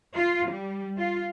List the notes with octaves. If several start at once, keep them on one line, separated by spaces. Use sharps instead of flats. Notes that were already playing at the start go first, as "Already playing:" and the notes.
F4
G3
F4